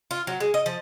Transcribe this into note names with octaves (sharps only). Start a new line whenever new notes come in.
F4
F#3
G#3
D#5
F3